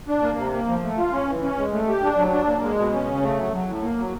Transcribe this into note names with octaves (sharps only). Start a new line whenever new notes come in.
D4
A#3
C3
A#3
F3
A3
F4
C#4
E3
C#4
G#3
A3
G4
D4
F#3
D4
A#3
G#3
B2
C#4
C#3
A3
F#3
F#3
A2
A#3
F#3